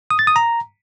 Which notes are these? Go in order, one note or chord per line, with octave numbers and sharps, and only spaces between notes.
D#6
A6
D#6
A#5